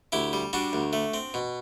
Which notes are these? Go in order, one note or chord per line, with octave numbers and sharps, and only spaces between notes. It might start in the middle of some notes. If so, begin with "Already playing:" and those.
D2 E4 G4
G3
G3 D4 F#4
D2
A3
C4
B2